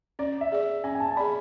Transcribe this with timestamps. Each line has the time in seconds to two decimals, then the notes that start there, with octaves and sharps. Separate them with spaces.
0.19 C#4 D5
0.41 E5
0.52 G#4 D5
0.84 C#4 G#5
0.95 G#5
1.00 A5
1.11 A5
1.17 G#4 D5 B5